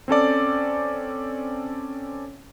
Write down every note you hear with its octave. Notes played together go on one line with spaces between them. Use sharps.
C4 C#4 A4 D5